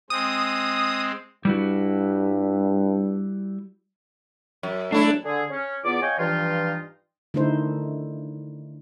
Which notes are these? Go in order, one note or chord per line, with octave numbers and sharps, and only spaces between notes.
G#3 C4 D#6
G2 G3 E4 F#4
F#2
F#3 A3 D4 E4
D3 G#4
C#4
E2 B3 F4 D5 D6
C#5 D#5 F5 G5 G#5
G2 E3 F3 D#4 F4
D3 D#3 A3 D#4 E4 C5